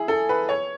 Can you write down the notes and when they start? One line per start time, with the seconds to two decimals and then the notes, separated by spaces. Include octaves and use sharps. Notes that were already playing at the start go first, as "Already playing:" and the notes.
Already playing: E4 G#4
0.08 A4
0.29 B4
0.49 C#5